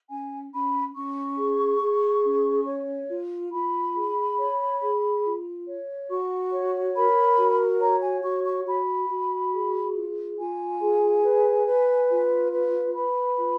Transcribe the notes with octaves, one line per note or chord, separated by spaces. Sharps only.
C#4 G#5
C#4 B5
C#4 C#6
G#4
G#4
C#4
C#5
F4
F4 B5
G#4
C#5
G#4
F4
C#5
F#4 C#6
C#5
A#4 B5
F#4
C#5 A#5
G#5
F#4 C#6
C#6
F#4 B5
F#4
G#4
F4
F4 G#5
G#4
B4
B4
F4
B4
B4 B5
F4